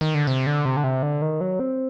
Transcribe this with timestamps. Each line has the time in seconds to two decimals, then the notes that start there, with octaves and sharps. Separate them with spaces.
0.01 D#3
0.15 D3
0.27 C3
0.47 D3
0.65 C3
0.77 D3
0.84 C3
1.02 D3
1.22 D#3
1.41 F#3
1.59 C4